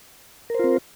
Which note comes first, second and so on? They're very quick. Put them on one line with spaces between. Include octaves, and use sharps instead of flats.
A#4 C5 F4 C4